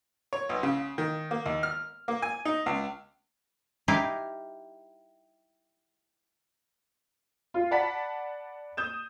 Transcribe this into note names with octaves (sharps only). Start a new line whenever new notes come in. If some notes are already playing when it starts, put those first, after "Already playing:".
C#5
B1
C#3
D#3
A#3
D#2
F6
A#3
G#5
D#4
C#2
D#4 E4 G4 F5
F4
D5 F#5 A5 B5 B6
D#6 G6 E7